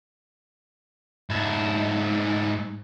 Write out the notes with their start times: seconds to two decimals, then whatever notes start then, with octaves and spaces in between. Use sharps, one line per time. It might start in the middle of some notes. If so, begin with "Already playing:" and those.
1.30 G#2 E4